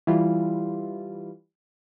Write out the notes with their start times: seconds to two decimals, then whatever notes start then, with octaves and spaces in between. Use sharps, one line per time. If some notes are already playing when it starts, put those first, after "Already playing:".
0.07 E3 G3 F4